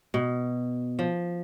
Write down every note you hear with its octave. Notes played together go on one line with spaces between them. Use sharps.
B2
F3